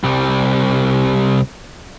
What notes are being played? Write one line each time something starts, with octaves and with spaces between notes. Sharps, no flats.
C2 G3